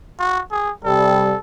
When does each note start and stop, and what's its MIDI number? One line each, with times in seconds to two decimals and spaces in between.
0.19 0.42 66
0.51 0.71 68
0.85 1.34 48
0.85 1.34 55
0.85 1.39 69